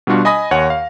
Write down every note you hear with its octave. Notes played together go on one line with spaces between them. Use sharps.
B2 G3 D4 F4 F#4
D#5 G#5 B5 D#6 A#6
D#2 C#5 F#5 G#5
F5